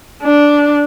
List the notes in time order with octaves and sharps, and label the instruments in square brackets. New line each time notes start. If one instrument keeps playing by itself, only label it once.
[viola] D4